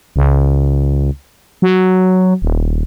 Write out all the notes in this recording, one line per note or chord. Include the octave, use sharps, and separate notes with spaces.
C#2
F#3
D#1